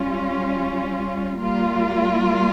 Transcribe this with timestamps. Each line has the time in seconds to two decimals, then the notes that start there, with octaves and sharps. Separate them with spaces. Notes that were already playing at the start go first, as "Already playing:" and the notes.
Already playing: G3 C#4 F4
1.41 G3 A#3 F4